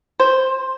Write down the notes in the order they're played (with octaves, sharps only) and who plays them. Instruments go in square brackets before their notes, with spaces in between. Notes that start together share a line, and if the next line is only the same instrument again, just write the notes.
[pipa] C5